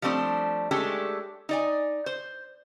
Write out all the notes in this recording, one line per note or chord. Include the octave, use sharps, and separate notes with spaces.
F3 G3 A3 C4 D4
G#3 A3 C#4 D4 G4 A4
D#4 D5 G#5
C5